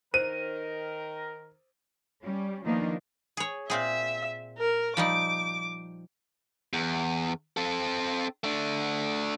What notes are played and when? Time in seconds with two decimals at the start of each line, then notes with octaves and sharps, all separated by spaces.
0.14 D#3 A#4 C5 D#7
2.23 G3 C#4
2.65 D#3 F3 A#3 B3 D4 D#4
3.37 G#4 C#5
3.70 A#2 C4 G#4 E5
4.58 A#4
4.97 F3 G3 D#4 D6
6.73 E2
7.57 C4 A4
8.44 A3 D4